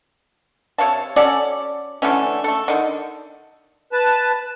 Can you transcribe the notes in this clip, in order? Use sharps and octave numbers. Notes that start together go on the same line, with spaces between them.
C3 C#5 F5 A5
C#4 F#4 A4 D5
D3 E3 A3 C#4
A3 A4
D3 D#3
B4 A5